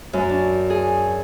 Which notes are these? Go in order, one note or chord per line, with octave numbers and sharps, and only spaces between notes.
F#2
D4
G#4